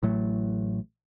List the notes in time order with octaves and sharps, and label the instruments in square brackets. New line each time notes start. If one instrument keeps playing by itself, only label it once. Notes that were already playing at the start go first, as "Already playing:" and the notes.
[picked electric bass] A1 A2 F#3 A3